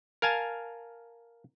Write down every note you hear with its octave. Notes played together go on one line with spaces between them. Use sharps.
A#4 F5 G#5 A5